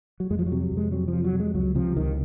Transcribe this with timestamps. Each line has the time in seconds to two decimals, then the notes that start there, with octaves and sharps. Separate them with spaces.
0.20 F#3
0.30 F2 G#3
0.39 F3
0.46 F#3
0.52 C3
0.61 F#3
0.72 F2
0.77 G#3
0.92 C3 F#3
1.08 F3
1.13 F2
1.24 F#3
1.34 C3
1.40 G#3
1.55 C#2 F#3
1.75 C3 F3
1.97 C#2 D#3